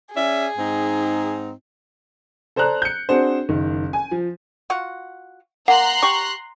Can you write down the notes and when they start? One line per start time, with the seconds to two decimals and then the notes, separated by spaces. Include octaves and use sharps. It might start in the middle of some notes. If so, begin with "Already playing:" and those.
0.15 C#4 G#4 D5 E5
0.58 G#2 C4 D#4
2.56 A4 C5 D5 A#5 F#6
2.82 G6 C#7
3.09 C4 D4 F#4 G#4 C5
3.49 F#1 D#3
3.93 G#5
4.11 F3
4.70 F4 F#4 F#5
5.68 A#3 F#5 A#5 C6 F#6
6.02 G4 C#6